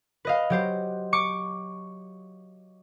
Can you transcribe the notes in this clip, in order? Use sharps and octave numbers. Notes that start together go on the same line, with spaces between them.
B4 D#5 F5
F#3 G4 C5
C#6 D6 C#7